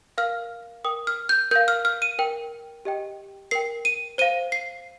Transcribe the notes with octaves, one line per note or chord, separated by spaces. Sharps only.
A#4 F5 F6
A#4 G5 D#6
F6
G6
A#4 F5 G6
F6
F6
D#7
A#4 G5
G4 D#5 G5
A#4 G5 C7
D#7
C5 F5 D#7
C7